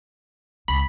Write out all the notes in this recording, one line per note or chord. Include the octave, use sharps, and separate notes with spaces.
C#2 B5